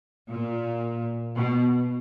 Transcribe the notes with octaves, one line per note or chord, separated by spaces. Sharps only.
A#2
B2